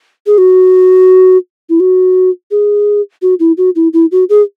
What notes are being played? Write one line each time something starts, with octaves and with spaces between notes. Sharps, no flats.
G#4
F#4
E4
F#4
G#4
F#4
E4
F#4
E4
E4
F#4
G#4